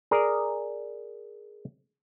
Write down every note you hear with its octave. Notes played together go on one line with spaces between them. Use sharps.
G#4 A#4 D5